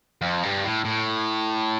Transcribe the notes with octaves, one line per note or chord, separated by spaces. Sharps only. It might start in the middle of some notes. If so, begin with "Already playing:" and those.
F2
G2
A2
A2